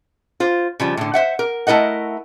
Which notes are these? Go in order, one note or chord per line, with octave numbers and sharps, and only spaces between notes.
F4 C5
C#3 F3 G3
A2 D3
C5 E5 F#5
A#4
A3 E4 A#4 D#5 F#5